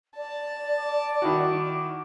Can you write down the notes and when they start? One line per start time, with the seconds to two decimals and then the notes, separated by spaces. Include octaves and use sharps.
0.17 D5 A5
0.79 D6
1.22 D#3 E4 F#4